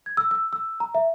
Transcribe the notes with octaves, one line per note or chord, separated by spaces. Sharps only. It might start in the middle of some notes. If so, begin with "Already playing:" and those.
G#6
E6
E6
E6
A#5
E5